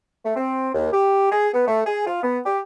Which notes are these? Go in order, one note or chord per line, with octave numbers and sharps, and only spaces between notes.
A3
C4
D#2
G4
G#4
B3
A3
G#4
F4
B3
G4